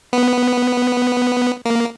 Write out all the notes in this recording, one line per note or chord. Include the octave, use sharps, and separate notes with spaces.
B3
A#3